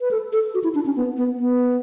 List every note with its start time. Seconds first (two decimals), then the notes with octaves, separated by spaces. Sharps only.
0.01 B4
0.11 A4
0.33 A4
0.54 F#4
0.64 E4
0.75 D4
0.86 C#4
0.96 B3
1.16 B3
1.38 B3